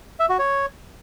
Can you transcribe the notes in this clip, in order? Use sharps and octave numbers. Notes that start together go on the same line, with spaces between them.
E5
F#4
C#5